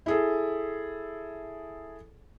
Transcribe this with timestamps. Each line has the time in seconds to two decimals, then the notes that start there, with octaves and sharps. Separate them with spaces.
0.06 E4 G#4 A4